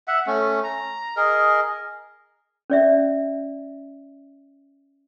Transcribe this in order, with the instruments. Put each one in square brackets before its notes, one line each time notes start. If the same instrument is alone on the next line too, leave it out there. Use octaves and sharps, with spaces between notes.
[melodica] E5 F#5
A3 C#4
A#5
G#4 A#4 D#5
[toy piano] C#4 D5 E5